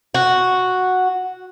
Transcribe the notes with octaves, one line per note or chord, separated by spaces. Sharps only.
F#4